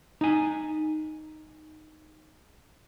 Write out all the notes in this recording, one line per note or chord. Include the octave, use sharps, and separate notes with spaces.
D#4 G#5